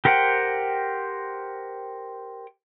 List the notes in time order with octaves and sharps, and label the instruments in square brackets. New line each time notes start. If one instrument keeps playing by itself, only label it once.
[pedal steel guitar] G4 A#4 C5 F#5 G5